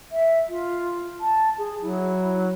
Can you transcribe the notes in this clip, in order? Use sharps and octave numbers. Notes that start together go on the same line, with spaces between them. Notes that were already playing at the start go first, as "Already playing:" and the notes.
E5
F4
A5
G#4
F#3 E4